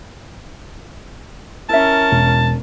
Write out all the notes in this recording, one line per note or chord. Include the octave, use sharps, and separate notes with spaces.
C#4 E4 A#4 E5 A5
E1